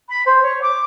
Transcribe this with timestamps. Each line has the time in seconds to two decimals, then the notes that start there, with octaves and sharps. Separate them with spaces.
0.09 B5
0.26 C5
0.42 C#5
0.62 D6